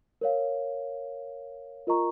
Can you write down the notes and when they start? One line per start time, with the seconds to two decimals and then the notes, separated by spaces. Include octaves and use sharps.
0.21 A#4 C#5 F5
1.87 F4 A#4 D#5 A#5 C#6